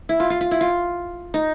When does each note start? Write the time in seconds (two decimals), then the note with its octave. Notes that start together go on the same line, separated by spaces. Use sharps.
0.09 E4
0.20 F4
0.30 F4
0.41 F4
0.51 E4
0.61 F4
1.34 D#4